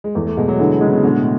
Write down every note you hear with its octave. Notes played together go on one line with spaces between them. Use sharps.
G#3
E2 A3
A3
B2 G#3
F#3
D3 E3
C#3 G#3
B2
B2 D3
A2